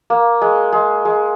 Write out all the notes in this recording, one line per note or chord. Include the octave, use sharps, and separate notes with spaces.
A#3
G#3
G#3
G#3